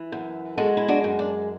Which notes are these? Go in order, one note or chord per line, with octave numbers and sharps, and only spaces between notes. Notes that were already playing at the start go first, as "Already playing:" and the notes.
Already playing: E3
F#2
G#3 F#4 A4
E4
D4 F#4
F#2
D4